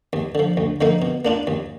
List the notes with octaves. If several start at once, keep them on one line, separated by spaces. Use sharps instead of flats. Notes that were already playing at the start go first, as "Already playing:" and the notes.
D#2
D3 F3
D2
D3 F3 A#3 D#4
B2
A#3 D4 F4
D#2